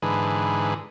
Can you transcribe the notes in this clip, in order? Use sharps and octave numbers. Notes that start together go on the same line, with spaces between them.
G#2 D3 E3 G#4 B4